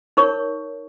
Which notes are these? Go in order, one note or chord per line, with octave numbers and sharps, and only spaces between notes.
D#4 A#4 C#5 C#6